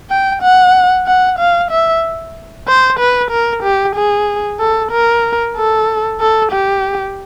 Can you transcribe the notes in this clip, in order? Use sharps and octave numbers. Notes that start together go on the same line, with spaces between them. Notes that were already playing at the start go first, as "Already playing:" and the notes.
G5
F#5
F#5
F5
E5
C5
B4
A#4
G4
G#4
A4
A#4
A4
A4
G4